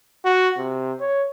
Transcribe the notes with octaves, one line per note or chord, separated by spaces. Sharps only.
F#4
C3
C#5